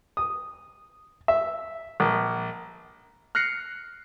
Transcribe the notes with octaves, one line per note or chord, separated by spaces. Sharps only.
D#6
E5
A#1
F6 F#6 A#6 C7 C#7